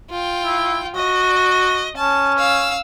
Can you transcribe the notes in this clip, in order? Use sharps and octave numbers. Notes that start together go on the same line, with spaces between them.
F4 G5
E4
F#4 D#5
C#4 A5
F5 E6